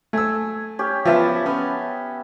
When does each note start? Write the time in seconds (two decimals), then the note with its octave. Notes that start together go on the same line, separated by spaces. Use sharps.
0.13 A3 G#5 E6
0.79 C#4 G4
1.05 F3 B3 E5 A5 B5
1.46 B3 C#4